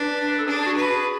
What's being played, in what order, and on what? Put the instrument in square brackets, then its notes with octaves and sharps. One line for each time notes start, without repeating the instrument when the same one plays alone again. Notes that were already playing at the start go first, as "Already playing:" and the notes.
Already playing: [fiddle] D4 [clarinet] B4
[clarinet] B4
A4
[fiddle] D4 [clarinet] G#4
[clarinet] G#4
F#4
[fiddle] B4
[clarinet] G#4